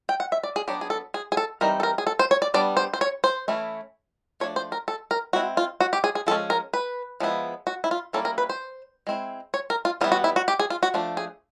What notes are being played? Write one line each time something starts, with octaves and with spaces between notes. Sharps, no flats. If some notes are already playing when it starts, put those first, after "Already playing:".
G5
F#5
E5
D5
G#4
F#3 B3 D4 G4
G#4
A4
G#4
G#4
A4
E3 G3 C4 D#4 A#4
A4
A#4
G#4
A4
C5
C#5
D5
G3 B3 D4 D5
C5
C5
C#5
C5
E3 A3 C#4 E4
F3 A3 D4 C#5
C5
A#4
A4
A#4
G#3 C4 E4 F#4
F4
F#4
G4
G#4
G#4
F3 G#3 C#4 A4
A#4
B4
F3 G#3 B3 E4
F#4
E4
F4
G3 A#3 C#4 E4 A4
A#4
B4
C5
G#3 C4 E4
C#5
A#4
F4
E3 G3 B3 E4 F4
F#4
E4
F#4
G4
G#4
F4
F#4
F3 A3 D4
G#4